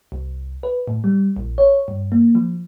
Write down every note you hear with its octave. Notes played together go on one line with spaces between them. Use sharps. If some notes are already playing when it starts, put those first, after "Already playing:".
C2
B4
A2
G3
A#1
C#5
G2
A#3
F3